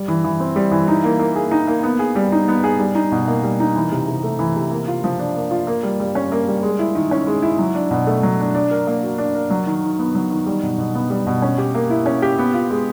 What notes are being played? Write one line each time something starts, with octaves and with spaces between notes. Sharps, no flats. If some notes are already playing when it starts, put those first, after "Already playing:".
Already playing: G3
E3
E3
C4
G3
E3
D#4
A#3
A#3
G#4
D#4
A#3
B3
G#4
G3
D#4
B3
G#4
G3
D#4
B2
A#3
G3
D#4
E3
C3
C3
A3
E3
C3
A#3
F4
F3
D4
A#3
F4
A#3
G3
G3
C#4
A#3
G3
G#3
E4
D#3
C#4
G#3
E4
F#3
D4
B2
A3
F#3
D4
D4
A#4
A#3
F#4
D4
A#4
F#3
D#3
D#3
B3
F#3
D#3
G3
B2
B2
B3
G3
B2
C#4
G4
A#3
E4
C#4
G4
B3
F4
G#3